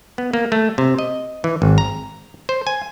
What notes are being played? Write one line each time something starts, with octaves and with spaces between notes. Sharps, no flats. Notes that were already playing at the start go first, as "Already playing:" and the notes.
B3
A#3
A3
C3
D#5
E3
G#1
A#5
C5
G#5